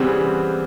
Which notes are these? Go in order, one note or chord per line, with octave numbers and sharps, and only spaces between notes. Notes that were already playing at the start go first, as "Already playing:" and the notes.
Already playing: C#3 E3 G3 B3 C4